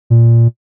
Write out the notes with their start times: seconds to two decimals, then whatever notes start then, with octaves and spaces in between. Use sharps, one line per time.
0.10 A#2